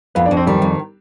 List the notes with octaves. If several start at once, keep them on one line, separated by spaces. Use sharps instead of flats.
F2 B3 B4
D4 D5
F2
C4 C5
D#3 G3 G4
F2